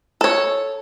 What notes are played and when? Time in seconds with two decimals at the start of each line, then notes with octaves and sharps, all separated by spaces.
0.21 A4 C#5